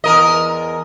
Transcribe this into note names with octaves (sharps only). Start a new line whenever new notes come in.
E2 A#4 D#5